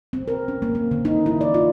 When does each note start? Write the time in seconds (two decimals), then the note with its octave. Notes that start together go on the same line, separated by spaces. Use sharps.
0.13 C4
0.28 A#4
0.48 C#4
0.62 A#3
0.75 A#3
0.91 D3
1.05 D#4
1.26 E4
1.41 D5
1.54 F4